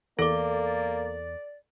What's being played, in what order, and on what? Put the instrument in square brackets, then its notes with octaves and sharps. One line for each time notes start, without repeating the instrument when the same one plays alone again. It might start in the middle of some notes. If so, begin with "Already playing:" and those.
[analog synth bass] E2 [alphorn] A#3 [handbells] A4 D6 [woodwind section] D5